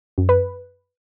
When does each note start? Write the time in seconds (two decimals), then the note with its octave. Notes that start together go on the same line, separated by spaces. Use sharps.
0.18 F#2
0.29 B4